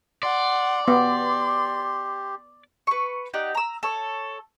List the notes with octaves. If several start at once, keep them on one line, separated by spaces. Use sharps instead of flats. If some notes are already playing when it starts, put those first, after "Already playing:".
D5 F#5 C6
B3 G4 C6
B4 C#6
D#4 G4 D5 F#5
A#5 E6
A4 C#5